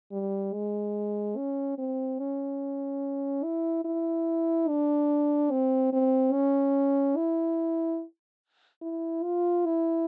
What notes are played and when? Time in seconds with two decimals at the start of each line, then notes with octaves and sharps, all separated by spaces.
0.11 G3
0.53 G#3
1.36 C#4
1.78 C4
2.19 C#4
3.43 E4
3.85 E4
4.68 D4
5.51 C4
5.93 C4
6.33 C#4
7.16 E4
8.82 E4
9.23 F4
9.66 E4